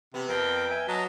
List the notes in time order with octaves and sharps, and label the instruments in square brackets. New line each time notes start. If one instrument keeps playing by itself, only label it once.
[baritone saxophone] C3 [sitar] B3
[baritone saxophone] F2 [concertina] A#4 [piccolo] G5
[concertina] E5 G#5
[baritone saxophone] F#3 [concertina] D#5 A5 A#5